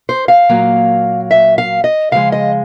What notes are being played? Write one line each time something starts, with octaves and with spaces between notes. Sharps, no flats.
C5
F5
A#2 F#3 A#3
E5
F5
D#5
C#3 F3 G#3 F5
D#5